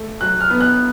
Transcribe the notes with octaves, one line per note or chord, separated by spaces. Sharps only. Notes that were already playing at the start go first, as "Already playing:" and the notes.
Already playing: A3
F#3 F#6
F6
B3
F#6